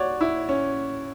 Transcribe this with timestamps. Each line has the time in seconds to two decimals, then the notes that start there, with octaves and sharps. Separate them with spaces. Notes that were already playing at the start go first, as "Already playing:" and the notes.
Already playing: F#4 C#5 D5
0.21 E4
0.49 C#4